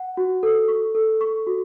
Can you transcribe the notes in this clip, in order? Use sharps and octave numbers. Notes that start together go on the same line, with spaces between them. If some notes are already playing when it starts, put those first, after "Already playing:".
Already playing: F#5
F#4
A4
C#6
A4
C#6
F#4